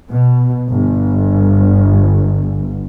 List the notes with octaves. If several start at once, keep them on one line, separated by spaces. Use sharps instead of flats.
B2
G1